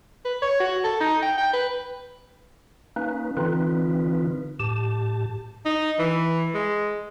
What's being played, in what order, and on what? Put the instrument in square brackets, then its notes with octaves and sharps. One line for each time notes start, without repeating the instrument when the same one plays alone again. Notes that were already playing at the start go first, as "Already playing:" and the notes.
[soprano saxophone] B4
C#5
F#4
A4
D#4
G5
G5
B4
[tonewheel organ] A#3 C#4 D#4 B4
D3 E3 C4 D#4 F4 B4
A2 G4 A5
[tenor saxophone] D#4
E3
G#3